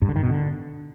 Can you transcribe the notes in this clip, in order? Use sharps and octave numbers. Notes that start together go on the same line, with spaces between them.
G2
D3
D#3
B2
D3